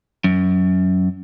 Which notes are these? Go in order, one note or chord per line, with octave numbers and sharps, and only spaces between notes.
F#2